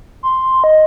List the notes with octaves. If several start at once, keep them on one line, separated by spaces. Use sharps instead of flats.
C6
D#5